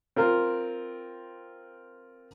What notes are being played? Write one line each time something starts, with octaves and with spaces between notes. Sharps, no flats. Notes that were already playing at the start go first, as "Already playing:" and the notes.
C4 F4 A#4